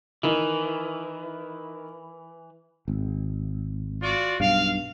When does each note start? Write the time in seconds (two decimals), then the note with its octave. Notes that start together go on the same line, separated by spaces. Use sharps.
0.23 D#3 E3 E4
2.88 G#1
4.02 F4 F#4 D5
4.40 B1 G2 F5